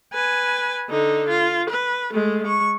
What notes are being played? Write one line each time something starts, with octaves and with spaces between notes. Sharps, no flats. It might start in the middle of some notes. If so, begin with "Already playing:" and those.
B4 G#5
D3 D#4
F4
B4
G#3 A3
G#3 C#6